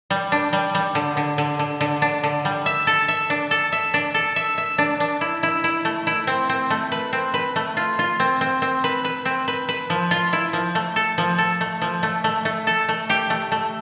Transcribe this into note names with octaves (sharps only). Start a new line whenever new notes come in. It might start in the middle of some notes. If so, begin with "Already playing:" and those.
G3
D4
G3
G3
D3
D3
D3
D3
D3
D4
D3
G3
E5
A4
E5
D4
A4
E5
D4
A4
E5
E5
D4
D4
E4
E4
E4
A3
E4
C4
C4
A3
B4
C4
B4
A3
F4
F4
C4
C4
C4
B4
B4
C4
B4
B4
F3
F4
E4
F3
A3
A4
F3
A4
A3
F3
A3
A3
A3
A4
A3
G4
A3
A3